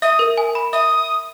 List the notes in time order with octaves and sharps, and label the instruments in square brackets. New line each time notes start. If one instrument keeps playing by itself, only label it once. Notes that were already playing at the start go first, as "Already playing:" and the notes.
[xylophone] E5 [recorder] D#6
[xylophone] A#4
G#5
B5
[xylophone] E5 [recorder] D#6